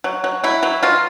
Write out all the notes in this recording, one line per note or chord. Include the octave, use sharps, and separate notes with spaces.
F#3
F#3
F#3 E4
F#3
F#3 F4